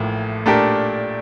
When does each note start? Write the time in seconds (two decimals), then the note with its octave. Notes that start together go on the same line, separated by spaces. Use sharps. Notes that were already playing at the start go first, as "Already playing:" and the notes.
Already playing: A1 A2 F3 A#3
0.46 A#2 A3 D4 G4 A#4